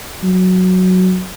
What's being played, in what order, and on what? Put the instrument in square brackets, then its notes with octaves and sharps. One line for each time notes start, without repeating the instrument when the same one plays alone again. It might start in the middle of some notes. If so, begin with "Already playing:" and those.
[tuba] F#3